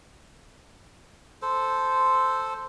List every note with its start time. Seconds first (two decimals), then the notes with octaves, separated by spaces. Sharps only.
1.42 A4 C5